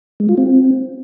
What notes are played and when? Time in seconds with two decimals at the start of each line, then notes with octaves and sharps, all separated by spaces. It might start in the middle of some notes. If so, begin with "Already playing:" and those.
0.20 G#3
0.29 F4
0.38 C4